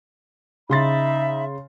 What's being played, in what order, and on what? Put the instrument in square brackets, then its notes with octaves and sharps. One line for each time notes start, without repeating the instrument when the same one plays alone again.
[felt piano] C#3 C6 A6 [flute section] D#4 E5 B5